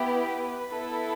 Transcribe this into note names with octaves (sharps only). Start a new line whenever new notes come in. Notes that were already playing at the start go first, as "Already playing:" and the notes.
Already playing: B3 E4 G4
B4
B3 E4 A4